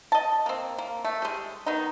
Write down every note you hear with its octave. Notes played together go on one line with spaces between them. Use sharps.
D#5 A5
A#3 C4
A#3
A3
G3 G#3
D#3 B3 D#4